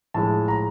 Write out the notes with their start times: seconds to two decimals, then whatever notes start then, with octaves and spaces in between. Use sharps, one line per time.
0.14 A2 F3 G#3 A5
0.48 A#5